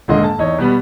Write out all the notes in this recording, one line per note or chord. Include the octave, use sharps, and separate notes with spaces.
D#1 G#2 D3 A#3 D#5 C6
A5
E2 D#4 C#5
B2 G3 B3